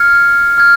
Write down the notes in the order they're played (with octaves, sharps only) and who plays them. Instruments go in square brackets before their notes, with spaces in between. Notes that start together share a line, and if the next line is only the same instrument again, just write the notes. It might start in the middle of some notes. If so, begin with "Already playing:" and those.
Already playing: [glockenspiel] F6 G#6 C#7
F6 G#6